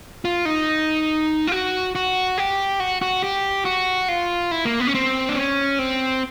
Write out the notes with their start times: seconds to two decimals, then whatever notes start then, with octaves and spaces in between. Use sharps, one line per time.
0.25 F4
0.45 D#4
1.47 F4
1.52 F#4
1.95 F#4
2.38 G4
2.80 F#4
3.02 F#4
3.24 G4
3.65 F#4
4.09 F4
4.51 E4
4.65 A#3
4.80 B3
4.87 C#4
4.95 C4
5.29 D4
5.36 C#4
5.79 C4